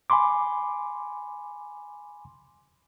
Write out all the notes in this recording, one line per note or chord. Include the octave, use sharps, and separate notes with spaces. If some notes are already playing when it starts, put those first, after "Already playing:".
G#5 B5 C6 D6